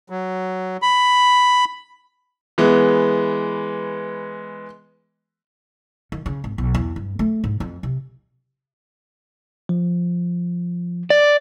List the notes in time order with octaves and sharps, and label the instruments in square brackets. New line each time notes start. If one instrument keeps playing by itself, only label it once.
[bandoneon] F#3
B5
[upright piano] E3 G#3 B3
[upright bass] D#3
C#3
G#1
B1
E2
G2
A3
G#2
F2
C3
[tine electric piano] F3
[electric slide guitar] D5